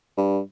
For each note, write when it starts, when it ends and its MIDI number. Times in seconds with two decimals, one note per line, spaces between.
0.17 0.40 43